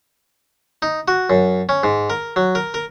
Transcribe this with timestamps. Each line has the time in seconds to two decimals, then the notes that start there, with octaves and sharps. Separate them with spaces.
0.82 D#4
1.08 F#4
1.30 F#2
1.69 C#4
1.84 G#2
2.10 A#4
2.36 F#3
2.55 A#4
2.74 A#4